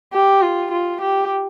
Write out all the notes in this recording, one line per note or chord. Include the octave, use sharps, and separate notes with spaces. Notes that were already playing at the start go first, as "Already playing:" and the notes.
G4
F4
F4
G4